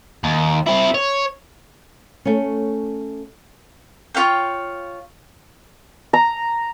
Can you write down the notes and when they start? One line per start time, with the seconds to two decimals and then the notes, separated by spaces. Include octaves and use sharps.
0.24 D#2
0.67 C4 E4
0.95 C#5
2.25 A3 C#4
4.14 F4 C#5 F5 G5
6.13 A#5